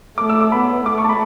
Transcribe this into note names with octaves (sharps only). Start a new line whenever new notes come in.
A3 D6
E6
D6
B3 B5
A3 D6
C#6
A5
B5